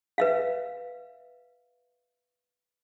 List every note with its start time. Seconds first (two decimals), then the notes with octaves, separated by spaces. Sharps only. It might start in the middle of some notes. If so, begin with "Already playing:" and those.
0.18 B4 E5 F5